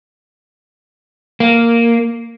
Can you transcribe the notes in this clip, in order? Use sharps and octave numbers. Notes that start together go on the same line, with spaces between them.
A#3